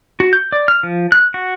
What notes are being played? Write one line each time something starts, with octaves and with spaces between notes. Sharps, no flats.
F#4
G6
D5
F6
F3
F#6
F#4